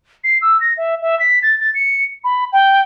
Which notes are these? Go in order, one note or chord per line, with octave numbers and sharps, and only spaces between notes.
C7
E6
A#6
E5
E5
B6
A6
A6
C#7
B5
G5